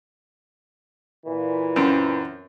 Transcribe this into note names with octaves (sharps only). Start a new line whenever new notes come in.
A#2 E3
F#2 C4